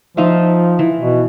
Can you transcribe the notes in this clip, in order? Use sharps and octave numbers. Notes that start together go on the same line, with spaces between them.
F3 D#4 F4 E5
E3
B2